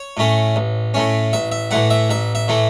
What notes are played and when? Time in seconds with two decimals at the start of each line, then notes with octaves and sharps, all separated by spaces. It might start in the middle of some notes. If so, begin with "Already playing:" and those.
Already playing: C#5
0.17 A2 A3 C#4
0.56 A1
0.94 A2 A3 C#4
1.33 A1 E5
1.51 E5
1.71 A2 E3 A3 F#5
1.90 E5
2.10 A1 E5
2.35 E5
2.48 A2 E3 A3